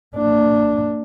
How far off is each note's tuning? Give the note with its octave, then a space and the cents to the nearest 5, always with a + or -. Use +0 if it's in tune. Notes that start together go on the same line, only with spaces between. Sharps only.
A#3 -35 D4 +0